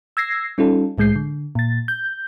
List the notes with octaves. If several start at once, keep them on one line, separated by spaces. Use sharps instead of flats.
E6 G#6 A#6 C7
G3 C#4 D#4 F4 A4
C2 A2 G#3 G6 C7
D3
A#2 A6
G6